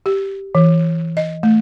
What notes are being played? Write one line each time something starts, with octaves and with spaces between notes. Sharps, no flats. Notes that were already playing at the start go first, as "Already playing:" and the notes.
G4
E3
D#5
A3